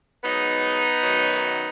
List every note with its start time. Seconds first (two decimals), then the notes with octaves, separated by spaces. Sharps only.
0.24 G#2 F#3 B3 D#4
1.02 F#2 D#3 F#3